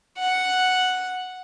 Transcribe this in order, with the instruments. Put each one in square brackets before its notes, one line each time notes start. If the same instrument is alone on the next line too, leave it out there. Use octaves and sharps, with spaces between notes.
[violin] F#5